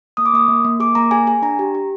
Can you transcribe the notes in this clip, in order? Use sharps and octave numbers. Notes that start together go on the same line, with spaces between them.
A#3 D#6
D6
A#3 D#6
A#3
A#3
G#4 D6
A#3 A#5
G#4 G#5
G#4 G#5
D4 A#5
G4
G4